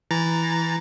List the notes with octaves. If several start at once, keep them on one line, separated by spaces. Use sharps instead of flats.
E3 A#5 A6